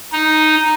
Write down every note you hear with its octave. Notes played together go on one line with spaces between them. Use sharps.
D#4